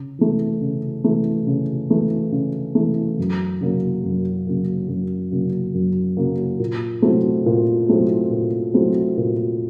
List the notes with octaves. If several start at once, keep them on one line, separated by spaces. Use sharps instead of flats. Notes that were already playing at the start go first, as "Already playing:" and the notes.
Already playing: C#3
E3 A3
C#3
E3 A3
C#3
E3 A3
C#3
E3 A3
F#2
C#3 F#3 A#3
F#2
C#3 F#3 A#3
F#2
C#3 F#3 A#3
F#2
C#3 F#3 A#3
A#2
F#3 A3 C4 E4
A#2
F#3 A3 C4 E4
A#2
F#3 A3 C4 E4
A#2